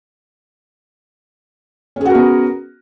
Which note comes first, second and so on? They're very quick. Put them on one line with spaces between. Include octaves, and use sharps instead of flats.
C#4 G#4 F#4 A#4 B3